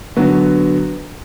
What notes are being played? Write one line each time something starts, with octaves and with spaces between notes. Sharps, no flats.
D3 F#3 B3 F#4